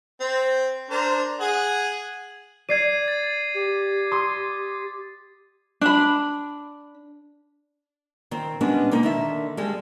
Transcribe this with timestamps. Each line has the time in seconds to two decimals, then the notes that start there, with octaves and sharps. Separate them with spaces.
0.20 C4
0.90 D4 A#4 C5
1.40 G#4 F#5
2.69 D5 G#6 C7 D#7
3.08 A6
3.55 G4
4.11 C6 D#6
5.81 D4 B5
8.31 D#3 C4
8.61 G3 G#3 B3 C#4 D4 D#5
8.91 B2 A#3 D#4
9.03 D3 D#3 E5
9.57 G3 G#3 A4